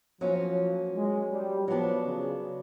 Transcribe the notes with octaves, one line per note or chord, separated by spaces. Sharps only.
F3 F#3 A#3 C#4 F4
G#3
G3
F3 F#3 B3 D4
C#3